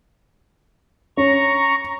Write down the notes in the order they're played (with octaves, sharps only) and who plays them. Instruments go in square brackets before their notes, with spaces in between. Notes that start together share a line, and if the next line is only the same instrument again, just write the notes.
[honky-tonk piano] C#4 [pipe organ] A#5 C#6